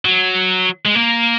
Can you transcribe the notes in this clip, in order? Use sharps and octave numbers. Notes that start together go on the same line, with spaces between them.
F#3
G#3
A#3